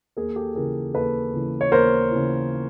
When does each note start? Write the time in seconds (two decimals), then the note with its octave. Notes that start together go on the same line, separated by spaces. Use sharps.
0.17 D#2 G#4 A#4
0.36 G4 A4
0.55 C#3 E3 G#4 A#4
0.94 D#2 A4 B4
1.34 C#3 E3
1.61 C#5
1.72 D#2 A#4 C5
2.11 C#3 E3